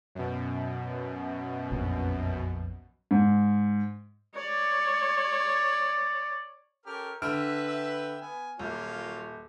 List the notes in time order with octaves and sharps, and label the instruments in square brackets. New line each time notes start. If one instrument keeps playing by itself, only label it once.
[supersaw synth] F#2 B2
[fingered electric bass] A#1 F2
[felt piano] G#2
[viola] C#5 [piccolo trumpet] D5
[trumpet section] C#4 G4 A4 [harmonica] A#4 F6
[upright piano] D3 F6 D7 [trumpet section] B4 [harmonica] E5 G5
[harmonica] E5 G5 E6
B3 G#5
[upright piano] D#1 [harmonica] F#3 F4 C#5 [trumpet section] A#3